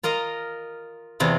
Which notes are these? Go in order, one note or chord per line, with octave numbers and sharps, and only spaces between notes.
F4 A#4 D#5 A#5
E2 C3 F4